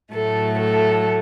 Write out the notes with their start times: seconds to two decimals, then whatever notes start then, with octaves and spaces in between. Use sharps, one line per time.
0.14 A2 F#3 A3 A4
0.59 A4